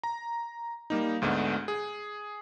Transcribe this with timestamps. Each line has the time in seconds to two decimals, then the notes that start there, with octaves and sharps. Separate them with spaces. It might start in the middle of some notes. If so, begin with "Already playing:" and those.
0.04 A#5
0.90 G3 A#3 D#4
1.22 D2 G#2 A3 B3 D4
1.68 G#4